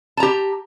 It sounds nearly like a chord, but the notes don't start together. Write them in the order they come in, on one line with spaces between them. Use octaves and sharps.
A5 A#5 G4